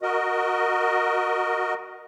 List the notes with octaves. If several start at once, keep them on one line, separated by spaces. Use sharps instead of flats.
F#4 A#4 D#5